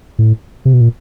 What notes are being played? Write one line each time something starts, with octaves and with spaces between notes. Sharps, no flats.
A2
C3
B2
A#2